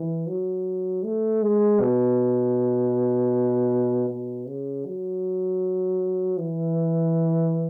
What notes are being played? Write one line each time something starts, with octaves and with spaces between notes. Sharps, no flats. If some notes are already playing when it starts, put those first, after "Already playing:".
Already playing: E3
F#3
A3
G#3
B2
B2
C#3
F#3
E3